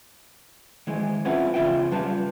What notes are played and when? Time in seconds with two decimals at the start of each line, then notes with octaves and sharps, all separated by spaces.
0.87 D#3 E3 G#3
1.25 C4 C#4 E4 F4 B4 F#5
1.54 E2 C#3 F4 E5 G5
1.92 G3 F4 B4 A5